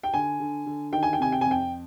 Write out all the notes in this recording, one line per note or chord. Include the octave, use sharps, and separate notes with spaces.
G5
D3 G#5
D3
D3
D#3 G5
G#5
G5
C3 G#5
G5
G#5
F2 G5